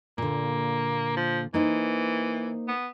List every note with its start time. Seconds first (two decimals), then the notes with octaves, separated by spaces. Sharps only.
0.18 A#2 D3 A#3
1.17 F3
1.54 E3 A#3 D#4 C5
2.68 B3